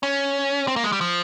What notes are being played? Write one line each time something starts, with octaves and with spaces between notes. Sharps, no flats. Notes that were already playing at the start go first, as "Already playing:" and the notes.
C#4
C4
A#3
G#3
G3
F3